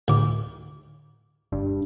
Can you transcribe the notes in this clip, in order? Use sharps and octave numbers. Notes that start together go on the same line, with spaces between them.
D2 A2 D6
G1 G2